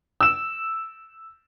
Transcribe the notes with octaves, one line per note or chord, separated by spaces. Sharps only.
E6 E7